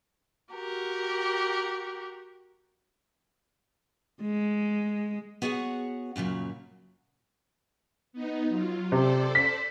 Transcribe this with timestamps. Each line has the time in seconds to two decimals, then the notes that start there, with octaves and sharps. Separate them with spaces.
0.52 F#4 G4 A#4
4.22 G#3
5.42 B3 F#4 G#4 C#5 F#5
6.16 F#2 A#2 C#3 F#3
8.13 B3 D#4
8.49 F#3 F4
8.92 C3 A4 C5 D5
9.35 B6